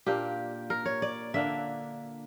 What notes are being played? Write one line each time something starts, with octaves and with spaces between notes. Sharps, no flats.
A#2 A#3 D4 G4
A#4
C#5
D5
D3 A#3 D4 E5